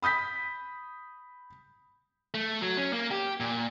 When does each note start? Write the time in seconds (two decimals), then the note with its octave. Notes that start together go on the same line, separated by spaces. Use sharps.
0.02 B5 D#6 G6 B6
2.34 A3
2.61 F#3
2.77 C#4
2.93 A#3
3.11 G4
3.40 A#2